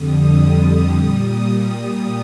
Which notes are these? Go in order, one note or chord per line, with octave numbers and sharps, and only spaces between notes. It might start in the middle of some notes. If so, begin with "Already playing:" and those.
Already playing: F2 D3 G3 D#6
A#2 G3 D#6